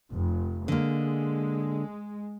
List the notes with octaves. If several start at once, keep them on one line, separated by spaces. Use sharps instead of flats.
F1
D3 G#3 A#3